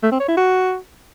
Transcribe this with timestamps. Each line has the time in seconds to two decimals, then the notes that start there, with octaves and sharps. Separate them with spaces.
0.03 A3
0.11 C4
0.20 C#5
0.28 E4
0.37 F#4